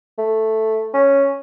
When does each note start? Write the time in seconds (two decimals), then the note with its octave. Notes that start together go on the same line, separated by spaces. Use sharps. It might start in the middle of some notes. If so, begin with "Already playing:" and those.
0.18 A3
0.94 C#4